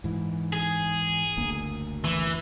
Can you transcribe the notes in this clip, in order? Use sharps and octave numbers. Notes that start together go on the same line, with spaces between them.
G#2 E3
G#4
F#1 D2 A#3
E3